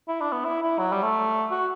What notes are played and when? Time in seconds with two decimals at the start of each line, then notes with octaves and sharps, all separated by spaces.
0.08 E4
0.21 D4
0.32 B3
0.45 E4
0.62 E4
0.79 F#3
0.92 G3
1.03 A3
1.51 F#4